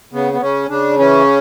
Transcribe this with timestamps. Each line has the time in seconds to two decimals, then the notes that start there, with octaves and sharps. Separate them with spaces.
0.13 C#3 B3
0.33 B3
0.41 C#3 C#4
0.69 C#3 D4
0.98 E3 C#4